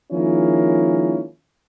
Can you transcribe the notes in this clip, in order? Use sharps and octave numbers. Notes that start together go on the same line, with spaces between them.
D#3 F3 G#3 A#3 C#4 E4